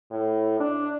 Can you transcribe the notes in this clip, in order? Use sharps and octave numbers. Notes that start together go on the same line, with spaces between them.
A2
D4